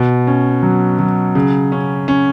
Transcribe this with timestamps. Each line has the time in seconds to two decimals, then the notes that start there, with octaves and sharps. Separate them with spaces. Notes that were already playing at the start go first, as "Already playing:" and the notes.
Already playing: B2
0.27 C#4
0.63 F#3
0.99 F#3
1.35 C#3
1.72 C#4
2.08 C#4